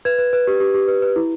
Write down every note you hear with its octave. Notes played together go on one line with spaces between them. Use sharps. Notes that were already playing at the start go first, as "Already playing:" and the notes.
B4 G#6
B4
B4
G4
G4
G4
B4
B4
E4